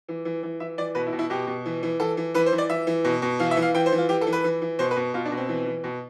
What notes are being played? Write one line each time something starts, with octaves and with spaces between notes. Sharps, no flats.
E3
E3
E3
E3 E5
E3 D5
B2 B4
E4
B2
E4
B2 G4
B2
E3
E3
E3 A4
E3
E3 B4
C5
E3
D5
E3 E5
E3
B2
B2
E3 F5
E5
E3
F5
E3 G5
C5
E3
F4
E3 G4
A4
E3
B4
E3
E3
B2 C5
B4
B2
B2 F4
D4
B2
C4
E3
E3
B2